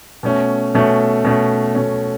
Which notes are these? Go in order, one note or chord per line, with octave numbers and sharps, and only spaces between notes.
B2 A3 C#4
B2 A3 C#4
B2 A3 C#4
B2 A3 C#4